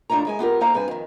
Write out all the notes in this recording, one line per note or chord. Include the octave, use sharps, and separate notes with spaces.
D#2 A2 D4 F4 C#5 A#5
F#2 G#3 G#5
B3 F4 G4 A#4
A#3 D#4 A4 C5 F5 A#5
G2 C4 B4 G#5
F2 D#3